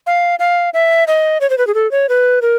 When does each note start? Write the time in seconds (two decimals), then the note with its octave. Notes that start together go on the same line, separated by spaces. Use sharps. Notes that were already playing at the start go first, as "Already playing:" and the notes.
0.07 F5
0.39 F5
0.74 E5
1.07 D#5
1.41 C#5
1.50 C5
1.58 B4
1.67 G#4
1.74 A4
1.91 C#5
2.09 B4
2.42 A#4